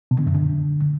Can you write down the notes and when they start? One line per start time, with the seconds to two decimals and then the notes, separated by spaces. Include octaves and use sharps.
0.11 B2
0.19 D3
0.27 F#2
0.34 D3